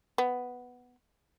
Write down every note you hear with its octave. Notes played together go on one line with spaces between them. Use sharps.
B3